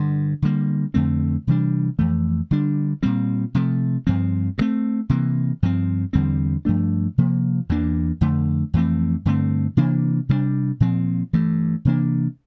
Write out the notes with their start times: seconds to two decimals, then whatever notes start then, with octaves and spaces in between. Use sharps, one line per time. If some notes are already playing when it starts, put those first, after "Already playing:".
Already playing: G2 D3 G3
0.42 D3 G3 A#3
0.94 F2 D3 A3 C4
1.47 C3 E3 G3 D4
1.98 F2 E3 A3
2.51 D3 G3 D4
3.03 A#2 G3 C4
3.55 C3 F3 A3
4.07 G2 F3 C4
4.58 G2 E3 A3 C4
5.09 C3 E3 A#3
5.62 G2 F3 C4
6.13 E2 D3 G3 C4
6.65 G2 F3 A3 D4
7.18 C3 F3 A#3
7.69 E2 E3 A#3 D4
8.21 F2 D3 A3
8.74 F2 E3 A3 C4
9.25 G2 D3 A3 C4
9.77 C3 E3 A#3 D4
10.29 C3 G3 A#3 D4
10.80 A#2 F3 C4
11.33 G2 E3 A3
11.85 C3 E3 A#3 D4